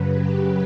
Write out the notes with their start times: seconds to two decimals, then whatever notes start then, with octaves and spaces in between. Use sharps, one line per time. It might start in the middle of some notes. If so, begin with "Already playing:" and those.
Already playing: F#2 C#3 F#3 B4
0.15 G4